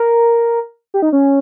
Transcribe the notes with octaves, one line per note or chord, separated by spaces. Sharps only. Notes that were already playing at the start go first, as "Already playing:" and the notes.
Already playing: A#4
G4
D#4
C#4